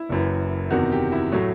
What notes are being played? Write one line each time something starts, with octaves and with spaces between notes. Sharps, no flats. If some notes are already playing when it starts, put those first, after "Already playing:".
Already playing: E4
F#1 F#2 E3
E2 C3 D#3 F#4
G4
E4
A2 F#3 A3 F#4